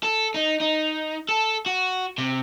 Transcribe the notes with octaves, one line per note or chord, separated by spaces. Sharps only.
A4
D#4
D#4
A4
F#4
C3